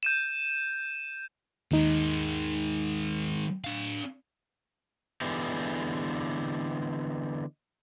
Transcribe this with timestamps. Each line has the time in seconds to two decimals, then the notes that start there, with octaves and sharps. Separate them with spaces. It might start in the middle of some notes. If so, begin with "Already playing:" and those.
0.03 G6 D#7 E7
1.71 D#2 D#3 G#3 D#4
3.64 D4 F5
5.21 D3 E3 G#3 B3 G4